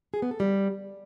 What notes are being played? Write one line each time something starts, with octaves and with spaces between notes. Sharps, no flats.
G#4
B3
A4
G3